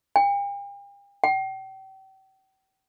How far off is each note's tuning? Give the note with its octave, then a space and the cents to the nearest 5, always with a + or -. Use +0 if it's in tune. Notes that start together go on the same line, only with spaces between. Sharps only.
G5 +45
G5 -35